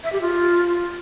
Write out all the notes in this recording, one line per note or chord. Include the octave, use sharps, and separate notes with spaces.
E5
G4
F4